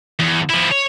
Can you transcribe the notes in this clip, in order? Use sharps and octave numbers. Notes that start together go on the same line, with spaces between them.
E2
F3 E4
C#5